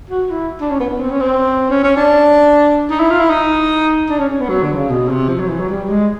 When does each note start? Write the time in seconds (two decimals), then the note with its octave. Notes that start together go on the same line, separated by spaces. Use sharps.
0.10 F#4
0.31 E4
0.61 D4
0.71 C#4
0.80 B3
0.90 B3
1.00 C4
1.10 C#4
1.21 C4
1.70 C#4
1.84 C#4
1.97 D4
2.90 D#4
3.00 E4
3.11 F4
3.20 E4
3.30 D#4
4.10 D4
4.19 C#4
4.30 C#4
4.40 B3
4.50 F#3
4.63 D3
4.76 C#3
4.90 B2
5.09 C3
5.29 F3
5.40 F#3
5.49 E3
5.60 F#3
5.69 G3
5.89 G#3